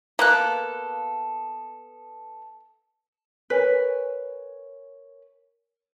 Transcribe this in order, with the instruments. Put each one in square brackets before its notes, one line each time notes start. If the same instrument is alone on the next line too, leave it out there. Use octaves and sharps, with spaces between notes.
[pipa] A#3 [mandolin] B3 A4 F#6
[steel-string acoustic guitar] A#4 C#5 G#5 [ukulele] B4